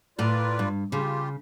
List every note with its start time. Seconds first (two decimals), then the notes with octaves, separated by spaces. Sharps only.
0.18 A2 F4 A#4 B4 D5
0.59 G2
0.92 C#3 F4 G4